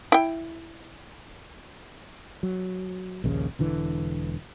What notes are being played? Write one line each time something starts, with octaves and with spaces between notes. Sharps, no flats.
E4 G5
F#3
A#1 D#2 C#3
E1 D3 E3